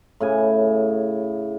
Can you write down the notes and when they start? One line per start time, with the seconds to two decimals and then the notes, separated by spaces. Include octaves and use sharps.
0.20 A2 C#3 G#5